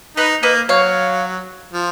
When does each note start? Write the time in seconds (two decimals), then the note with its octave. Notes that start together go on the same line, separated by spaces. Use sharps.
0.17 D#4 B4 D#5
0.43 A#3 B4 D#5
0.69 F#3 C#5 F5
1.73 F3